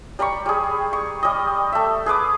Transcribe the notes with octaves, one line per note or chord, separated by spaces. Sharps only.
G3 A#5 B5 C#6
G3 G#4
C#6
G3 D#5
A3 E5
G#4 B4 D6 D#6